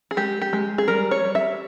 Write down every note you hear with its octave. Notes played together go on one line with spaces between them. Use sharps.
G#4
G#3 G4
G4
G#3
G#4
G3 A#4
C#5
G3
E5